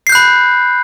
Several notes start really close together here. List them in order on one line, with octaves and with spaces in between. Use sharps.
C7 G6 F#6 B5